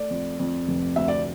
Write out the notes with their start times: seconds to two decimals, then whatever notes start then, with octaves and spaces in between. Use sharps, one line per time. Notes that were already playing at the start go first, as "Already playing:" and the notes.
Already playing: A3 D5
0.10 F2
0.39 F2
0.68 F1
0.96 D2 E5
1.08 D5